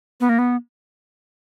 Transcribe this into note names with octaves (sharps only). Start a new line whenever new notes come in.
B3
A#3
B3